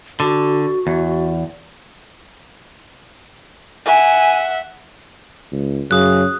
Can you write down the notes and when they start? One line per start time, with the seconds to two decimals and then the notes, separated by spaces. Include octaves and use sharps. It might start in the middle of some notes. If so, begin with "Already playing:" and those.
0.20 D3 F#4
0.87 E2
3.86 E5 F#5 G#5
5.52 C#2
5.91 F#2 C#3 D#6 F#6